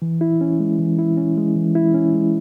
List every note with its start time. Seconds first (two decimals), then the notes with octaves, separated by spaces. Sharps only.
0.02 E3
0.21 E4
0.41 C#4
0.60 G#3
0.79 E3
0.99 E4
1.17 C#4
1.37 G#3
1.56 E3
1.75 E4
1.94 C#4
2.14 G#3